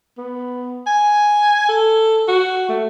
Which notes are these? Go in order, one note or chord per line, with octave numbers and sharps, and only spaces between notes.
B3
G#5
A4
F#4
A3